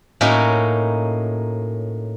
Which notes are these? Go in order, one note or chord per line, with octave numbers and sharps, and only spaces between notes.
A2 A#3 C#4 D#4 F#4